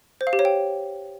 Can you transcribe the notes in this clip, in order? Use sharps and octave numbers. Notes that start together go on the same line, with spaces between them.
C5
F5
G4
C#5
G5